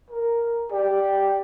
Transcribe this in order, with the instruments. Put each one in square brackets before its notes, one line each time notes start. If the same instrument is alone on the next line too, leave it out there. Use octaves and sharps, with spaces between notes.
[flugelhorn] A#4
[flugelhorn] G4 [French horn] D5